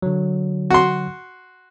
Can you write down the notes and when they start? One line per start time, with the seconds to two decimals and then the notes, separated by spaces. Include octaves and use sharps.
0.02 D3 F#3
0.70 F#4 C6